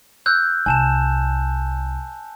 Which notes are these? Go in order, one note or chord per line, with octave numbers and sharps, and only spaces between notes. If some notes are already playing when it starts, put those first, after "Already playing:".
E6 F#6 G6
C2 G#5 A5 E7